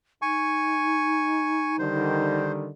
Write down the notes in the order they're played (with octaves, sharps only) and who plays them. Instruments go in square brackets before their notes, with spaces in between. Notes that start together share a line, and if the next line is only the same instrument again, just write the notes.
[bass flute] D#4 [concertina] G#5 C#6
[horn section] D3 D#3 G3 [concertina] C5